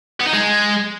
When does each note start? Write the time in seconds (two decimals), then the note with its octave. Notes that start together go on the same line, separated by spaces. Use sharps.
0.20 B3
0.27 D#4
0.33 G#3